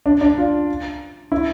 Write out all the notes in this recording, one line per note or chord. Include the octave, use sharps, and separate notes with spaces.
D4
D4
F4
E4